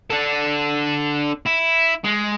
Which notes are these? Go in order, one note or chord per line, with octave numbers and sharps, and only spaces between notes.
D4 A4
E4
G#3